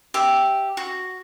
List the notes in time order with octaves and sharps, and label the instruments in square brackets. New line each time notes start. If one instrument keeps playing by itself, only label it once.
[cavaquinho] G4 E5
F#4